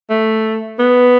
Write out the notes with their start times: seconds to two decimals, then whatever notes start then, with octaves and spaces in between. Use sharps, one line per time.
0.10 A3
0.79 B3